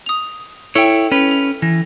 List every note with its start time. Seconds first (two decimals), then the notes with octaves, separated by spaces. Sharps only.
0.06 D#6 F7
0.75 E4 A4 C#5 G5
1.12 C#4 B4
1.31 F7
1.62 E3 A#6